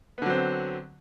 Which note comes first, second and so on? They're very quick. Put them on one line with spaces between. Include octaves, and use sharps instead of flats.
B3 D3 F#3 C4